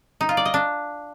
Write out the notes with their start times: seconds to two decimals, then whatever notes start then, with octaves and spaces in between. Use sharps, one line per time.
0.21 D#4
0.29 F4
0.37 D5
0.45 D#5
0.54 D4